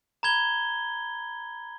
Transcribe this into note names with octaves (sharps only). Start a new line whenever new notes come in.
A#5 B5 G#6 G7